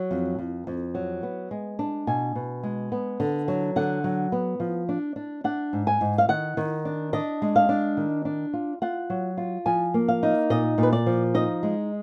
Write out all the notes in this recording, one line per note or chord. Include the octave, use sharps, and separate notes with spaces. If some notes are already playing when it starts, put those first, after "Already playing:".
Already playing: F#3
F2
F2
F2
F#3
B3
G#3
D4
B2 G#5
B2
G#3
B3
D3
F#3
D3 F#5
F#3
B3
F3
D4
D4
D4 F#5
G#2
G#5
G#2
F5
D#3 F#5
D#3
D4
D4 D#5
G#3
F5
D4
D#3
D4
F4
F4 F#5
F#3
F4
F3 G#5
A#3
F5
D#4
A#2 D#5
A#2
B4
D5
F3
D#4 D#5
G#3